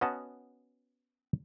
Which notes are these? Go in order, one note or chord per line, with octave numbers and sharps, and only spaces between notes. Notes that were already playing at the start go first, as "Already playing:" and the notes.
B3 C#4 F#4 D#5 F#5 A5